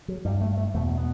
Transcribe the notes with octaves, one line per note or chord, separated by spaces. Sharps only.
F#3
G2 G3
A3
A3
E2 B2 A3
B3